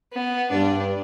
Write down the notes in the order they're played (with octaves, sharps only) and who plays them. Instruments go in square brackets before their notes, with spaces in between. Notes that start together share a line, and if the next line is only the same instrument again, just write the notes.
[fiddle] B3
[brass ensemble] G2 [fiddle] D4